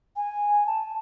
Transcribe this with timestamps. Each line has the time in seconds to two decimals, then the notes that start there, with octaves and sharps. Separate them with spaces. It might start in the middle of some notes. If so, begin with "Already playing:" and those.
0.16 G#5
0.66 A5